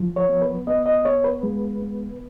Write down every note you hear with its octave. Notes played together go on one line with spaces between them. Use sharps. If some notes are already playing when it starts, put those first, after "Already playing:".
Already playing: F3
C#5
B3
B4
B3 D#5
D#5
B3 C#5
B4
G#3
B3